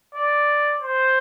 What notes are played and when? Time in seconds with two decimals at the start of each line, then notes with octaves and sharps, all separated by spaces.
0.15 D5
0.81 C5